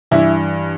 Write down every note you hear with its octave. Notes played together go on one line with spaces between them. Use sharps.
G2 E3 E4